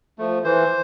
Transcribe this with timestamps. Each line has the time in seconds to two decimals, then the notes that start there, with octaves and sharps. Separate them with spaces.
0.18 F3 A3
0.44 E3 C5